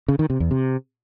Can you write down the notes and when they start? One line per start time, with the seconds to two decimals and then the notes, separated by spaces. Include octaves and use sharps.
0.08 C#3
0.19 D#3
0.30 C3
0.40 E2
0.51 C3